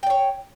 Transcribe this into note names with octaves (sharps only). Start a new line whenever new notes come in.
C#5 D5 G5